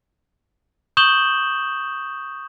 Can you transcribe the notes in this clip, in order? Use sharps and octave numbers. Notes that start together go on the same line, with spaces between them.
C#6 D#6 G6 E7 F#7 G7